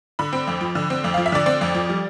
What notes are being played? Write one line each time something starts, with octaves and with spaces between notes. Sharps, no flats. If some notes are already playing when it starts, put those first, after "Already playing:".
D3 B5
C4
F2
F3
D3
C4
F2
F3 F5
E5
D3 D5
C4 D5
F2
F3
G3